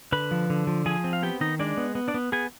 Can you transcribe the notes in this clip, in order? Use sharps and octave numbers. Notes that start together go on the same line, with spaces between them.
D3 B4 B5
F3
D3
F3
F3 G#4 G#5
C4
F5
B3 G4 G5
D#3 D#4 D#5
G#3 D4 D5
B3
B3
D4 D5
B3
B3 G#4 G#5